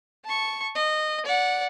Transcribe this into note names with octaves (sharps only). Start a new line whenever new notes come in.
A5 C#6
D#5
D5 F#5